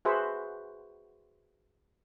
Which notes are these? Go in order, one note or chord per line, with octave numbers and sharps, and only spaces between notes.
F#4 G#4 B4 C5 E5 F#5